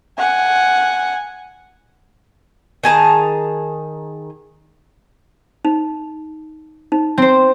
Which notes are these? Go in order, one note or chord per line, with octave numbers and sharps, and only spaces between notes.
F#5 G#5
D#3 G#4 A5 A#5
D#4
D#4
C4 C5